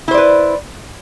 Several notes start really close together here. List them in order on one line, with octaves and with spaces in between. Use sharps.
E4 C5 D5 B4